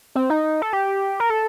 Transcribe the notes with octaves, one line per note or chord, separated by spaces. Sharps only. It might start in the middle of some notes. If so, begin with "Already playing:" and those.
C4
D#4
A4
G4
A#4
A4